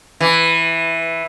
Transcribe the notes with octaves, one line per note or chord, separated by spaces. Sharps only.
E3